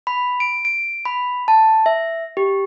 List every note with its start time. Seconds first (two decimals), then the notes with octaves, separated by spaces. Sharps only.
0.07 B5
0.40 D7
0.65 D7
1.05 B5
1.48 A5
1.86 E5
2.37 G4